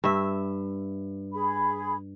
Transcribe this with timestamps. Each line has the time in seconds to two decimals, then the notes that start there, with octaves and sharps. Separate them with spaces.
0.04 G2 E5
1.34 G#4 B5